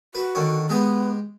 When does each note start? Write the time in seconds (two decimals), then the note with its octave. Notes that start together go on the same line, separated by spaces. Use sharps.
0.15 F#4 B4
0.35 D3 D#3 C#5
0.69 G#3 B3 G4 G#4